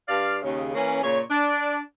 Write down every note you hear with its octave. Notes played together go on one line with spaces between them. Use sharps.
G2 D5 F5
D#2 C#3
E3 A#3 C#4
A#2 C#3 C#5
D4